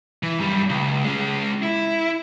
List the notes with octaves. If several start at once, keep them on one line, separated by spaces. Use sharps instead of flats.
E3
F#2 G3
C#2
G#3 C#4
E4